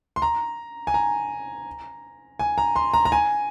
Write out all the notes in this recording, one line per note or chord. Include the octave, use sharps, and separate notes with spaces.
C6
A#5
G#5
A#5
G#5
A#5
C6
A#5
A#5
G#5